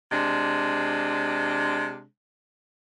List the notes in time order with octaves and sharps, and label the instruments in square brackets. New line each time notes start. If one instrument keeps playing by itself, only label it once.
[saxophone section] C3 G#3 D4